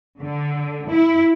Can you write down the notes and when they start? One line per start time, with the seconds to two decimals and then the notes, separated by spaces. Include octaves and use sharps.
0.20 D3
0.89 E4